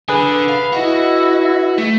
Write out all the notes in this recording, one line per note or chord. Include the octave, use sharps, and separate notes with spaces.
D3 G#4 B4
F5 B5
E4 F#4 D#5
A3